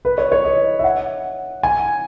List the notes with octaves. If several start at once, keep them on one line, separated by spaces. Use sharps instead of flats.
B4
C#5
C#5
D#5
E5
F#5
G#5